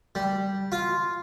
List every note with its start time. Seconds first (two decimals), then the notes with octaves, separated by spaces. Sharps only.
0.15 G3
0.72 F4